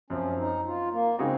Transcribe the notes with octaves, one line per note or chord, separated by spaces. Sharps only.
F#2 F3 C4 C#4
D#4
F4
A#3
C#3 G#3 C4 D#4 F#4